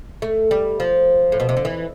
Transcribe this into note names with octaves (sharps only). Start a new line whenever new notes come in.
A3
G3
F3
A2
B2
C3
D3
E3